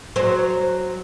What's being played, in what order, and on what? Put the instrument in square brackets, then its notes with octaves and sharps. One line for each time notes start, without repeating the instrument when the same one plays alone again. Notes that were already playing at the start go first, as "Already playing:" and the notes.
[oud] F#3 C5